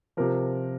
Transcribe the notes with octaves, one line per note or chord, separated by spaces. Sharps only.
C3 F3 A#4